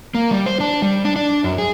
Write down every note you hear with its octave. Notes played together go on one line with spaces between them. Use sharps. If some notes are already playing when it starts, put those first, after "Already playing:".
A#3
G3
C5
D4
G3
D4
D4
F#2
G#4